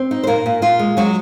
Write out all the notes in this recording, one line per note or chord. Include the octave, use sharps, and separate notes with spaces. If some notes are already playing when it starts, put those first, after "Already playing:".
Already playing: C4
D#4
C5
A#2 A#3 A#4
A#2
A#2 F4
G#3
F#3 G#3 F#4